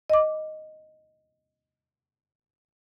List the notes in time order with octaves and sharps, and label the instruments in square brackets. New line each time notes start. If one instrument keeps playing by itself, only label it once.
[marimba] D#5 D6